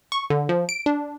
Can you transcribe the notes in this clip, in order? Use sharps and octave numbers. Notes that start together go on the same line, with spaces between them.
C#6
D3
F3
D7
D4